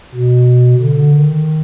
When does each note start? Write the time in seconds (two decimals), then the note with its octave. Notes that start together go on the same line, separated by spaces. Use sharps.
0.15 B2
0.81 D3
1.14 D#3